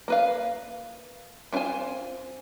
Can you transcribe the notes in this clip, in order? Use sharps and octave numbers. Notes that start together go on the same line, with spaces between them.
A#3 B4 F5
C4 E4 F4 C5 G#5